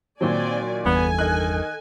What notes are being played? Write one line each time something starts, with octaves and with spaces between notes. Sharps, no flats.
A#2 D#3 F#3 C4 D5 G#5
G1 E2 G2 B3 A4 G#5
D#3 D#5 F#6